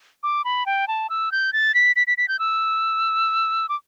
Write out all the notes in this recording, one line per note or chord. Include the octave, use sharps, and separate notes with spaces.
D6
B5
G5
A5
E6
G6
A6
B6
B6
B6
B6
G6
E6
D6